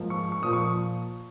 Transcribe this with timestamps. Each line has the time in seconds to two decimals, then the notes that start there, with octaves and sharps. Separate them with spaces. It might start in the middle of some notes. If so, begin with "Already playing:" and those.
Already playing: G#2 F3 A#3
0.10 C#6
0.32 C#6
0.42 A#2 F3 A#3 D#6
0.53 C#6